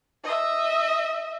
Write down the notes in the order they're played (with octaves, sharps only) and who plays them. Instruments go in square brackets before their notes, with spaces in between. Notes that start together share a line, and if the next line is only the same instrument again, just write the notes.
[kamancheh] D#5 E5